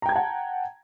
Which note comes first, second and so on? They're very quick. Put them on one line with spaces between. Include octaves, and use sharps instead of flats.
A#5 G5 G#6 A5 F#5